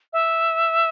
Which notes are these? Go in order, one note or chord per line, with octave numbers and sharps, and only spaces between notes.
E5